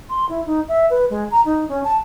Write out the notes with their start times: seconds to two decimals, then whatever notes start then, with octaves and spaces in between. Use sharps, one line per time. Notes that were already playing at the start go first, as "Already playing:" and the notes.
0.09 C6
0.29 E4
0.46 D#4
0.68 E5
0.90 B4
1.10 G#3
1.31 A#5
1.45 D#4
1.68 C#4
1.84 A5